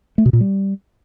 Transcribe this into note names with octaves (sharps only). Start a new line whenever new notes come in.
A3
B2
A#2
G3